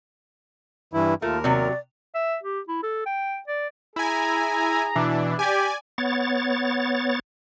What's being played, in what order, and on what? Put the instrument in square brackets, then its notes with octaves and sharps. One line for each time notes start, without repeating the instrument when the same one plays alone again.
[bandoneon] G2 E3 E4
[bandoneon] D#2 A#4 [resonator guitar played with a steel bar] A3 [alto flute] F4
[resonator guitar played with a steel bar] C3 F#3 [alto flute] D5
[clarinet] E5
G4
E4
A4
G5
D5
[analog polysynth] E4 G#5 [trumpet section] G#4 A#5
[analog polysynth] B2 E3 D4
[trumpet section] G4 [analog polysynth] D5 G#5
[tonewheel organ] B3 C#5 A6